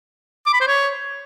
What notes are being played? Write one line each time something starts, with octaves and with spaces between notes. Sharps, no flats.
D6
B5
C5
C#5